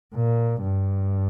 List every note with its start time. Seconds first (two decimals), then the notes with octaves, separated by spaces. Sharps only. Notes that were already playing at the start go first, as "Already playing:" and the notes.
0.15 A#2
0.62 G2